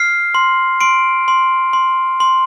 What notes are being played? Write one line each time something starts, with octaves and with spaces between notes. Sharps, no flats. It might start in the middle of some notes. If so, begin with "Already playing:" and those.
Already playing: F6 C7
C6
C6 D7
C6
C6
C6